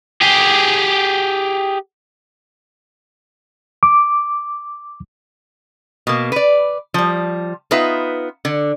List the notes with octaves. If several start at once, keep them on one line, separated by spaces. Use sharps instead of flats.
G4 G#4
D6
B2 A#3
B4 D5
F3 G3
B3 D#4 F4 B4 E5
D3